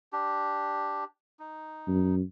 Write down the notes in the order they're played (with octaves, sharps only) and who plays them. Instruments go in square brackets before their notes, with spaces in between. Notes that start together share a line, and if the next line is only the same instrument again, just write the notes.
[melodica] D4 G4
D#4
[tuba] F#2